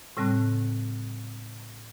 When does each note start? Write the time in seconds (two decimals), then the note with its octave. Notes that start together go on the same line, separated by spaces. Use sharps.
0.17 A2 C#3 G3 C4 A5 F#6